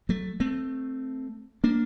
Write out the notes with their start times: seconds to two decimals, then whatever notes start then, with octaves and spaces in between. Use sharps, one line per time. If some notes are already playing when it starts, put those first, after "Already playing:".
0.09 F#3 A3
0.40 A3 C4
1.64 A#3 D4